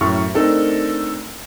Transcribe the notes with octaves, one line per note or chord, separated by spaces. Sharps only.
F#2 A2 C#6 F6
A3 C4 D4 D#4 A4 A#4